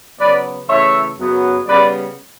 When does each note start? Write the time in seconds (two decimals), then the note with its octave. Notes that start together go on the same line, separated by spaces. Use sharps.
0.19 C#3 F#3 B3 B4 D5
0.68 C#3 E3 A3 C#5 E5
1.17 F#2 C#3 F#3 B3
1.66 C#3 G3 B3 B4 D5